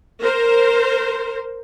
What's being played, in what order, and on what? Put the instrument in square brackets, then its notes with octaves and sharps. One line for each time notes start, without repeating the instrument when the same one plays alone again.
[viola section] A#4 C5